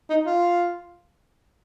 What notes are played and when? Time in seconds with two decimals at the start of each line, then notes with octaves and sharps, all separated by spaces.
0.10 D#4
0.26 F4